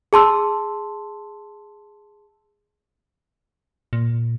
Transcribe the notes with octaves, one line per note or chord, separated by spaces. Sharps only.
G#4 A5 C6 E6
A#2